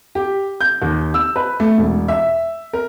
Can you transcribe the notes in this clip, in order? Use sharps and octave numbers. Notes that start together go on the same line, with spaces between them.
G4
G6
D#2
E6
B4
A3
E1
E5
A#4